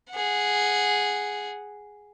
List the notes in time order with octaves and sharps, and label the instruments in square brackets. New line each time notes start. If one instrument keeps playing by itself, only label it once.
[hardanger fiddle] G#4 F#5